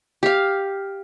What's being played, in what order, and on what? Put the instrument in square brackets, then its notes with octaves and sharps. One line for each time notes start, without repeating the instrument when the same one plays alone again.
[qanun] G4 F5